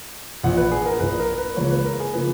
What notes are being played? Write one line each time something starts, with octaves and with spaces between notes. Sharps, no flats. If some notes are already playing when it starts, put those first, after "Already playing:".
A#1 A#2 F3 F#5
B4
G#4
A#4
A#1 A#2 F3 B4
A#4
B4
C#2 C#3 F3 A#3 C#5
B4
A#4
G#4
C#3 F3 A#3 B4